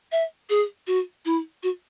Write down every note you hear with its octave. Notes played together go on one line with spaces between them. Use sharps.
E5
G#4
F#4
E4
F#4